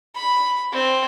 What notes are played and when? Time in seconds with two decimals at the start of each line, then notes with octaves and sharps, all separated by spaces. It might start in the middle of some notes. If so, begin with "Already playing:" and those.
0.15 B5
0.73 C4